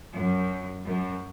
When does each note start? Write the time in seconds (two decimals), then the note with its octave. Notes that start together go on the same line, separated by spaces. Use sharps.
0.13 F#2
0.85 F#2